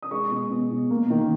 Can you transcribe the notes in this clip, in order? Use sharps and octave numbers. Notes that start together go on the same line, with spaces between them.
D#6
G#3 C#6
B2
B2
B2
A#3
D#3